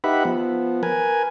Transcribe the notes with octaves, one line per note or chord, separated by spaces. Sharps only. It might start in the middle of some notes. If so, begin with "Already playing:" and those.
D#4 G4 B4 E5 F#5 B5
F3 B3
A#4 B4 G#5